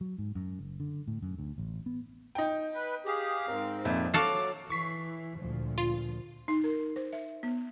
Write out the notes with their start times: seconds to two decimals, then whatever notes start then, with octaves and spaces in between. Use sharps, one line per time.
0.01 F#3
0.18 G#2
0.35 F#2
0.59 F#1
0.80 D3
1.07 A2
1.22 F#2
1.38 D2
1.58 A1
1.86 B3
2.35 D#4 G5
2.74 B4
3.06 G4 G#4 F5
3.48 G#2 C4 A#4
3.85 F2 A#2 E5
4.14 F#3 F#4 A4 F5 D6 C7
4.70 E3 C#6 B6 C7
5.38 D2 A#2 F3
5.78 F4
6.48 D#4
6.64 A#4
6.96 C5
7.13 E5
7.43 B3